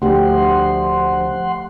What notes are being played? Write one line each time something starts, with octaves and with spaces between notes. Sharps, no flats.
D2 F3 A3 G4 F#5 C6